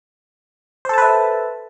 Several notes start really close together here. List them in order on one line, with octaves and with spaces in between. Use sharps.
C5 A4 A5 B4 E5